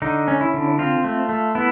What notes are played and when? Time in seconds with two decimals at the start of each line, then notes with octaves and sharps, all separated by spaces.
0.02 D3 D#4
0.28 C#4
0.41 E4
0.54 D3
0.79 C4 F4
1.04 A3
1.29 A3
1.55 B3 E4